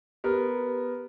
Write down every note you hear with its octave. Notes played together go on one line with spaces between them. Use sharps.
B3 G4 A#4 B4